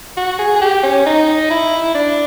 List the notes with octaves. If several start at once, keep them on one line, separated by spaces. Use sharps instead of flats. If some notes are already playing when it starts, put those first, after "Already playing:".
F#4
G#4
G#4
G4
C#4
D#4
E4
D4